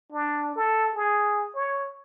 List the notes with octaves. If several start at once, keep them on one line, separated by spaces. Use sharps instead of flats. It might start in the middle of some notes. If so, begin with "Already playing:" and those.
D4
A4
G#4
C#5